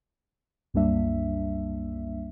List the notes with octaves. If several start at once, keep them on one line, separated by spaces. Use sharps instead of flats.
C2 F#2 G3 A#3 D4 E5